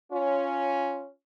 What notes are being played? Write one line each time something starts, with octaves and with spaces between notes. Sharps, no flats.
C#4 F4